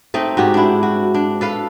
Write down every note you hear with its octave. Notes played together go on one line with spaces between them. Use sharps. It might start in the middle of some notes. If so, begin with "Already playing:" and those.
A3 C4 D#4
G#2 F#4 G4
D4 E4
F#4
D4
A4 B4 F5